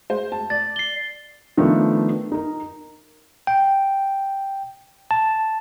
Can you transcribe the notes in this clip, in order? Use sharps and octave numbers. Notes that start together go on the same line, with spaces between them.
G#3 C5
A5
D5 A6
C7 G7
D#3 F3 A3 B3 D4
D#4 A#4
G5
A5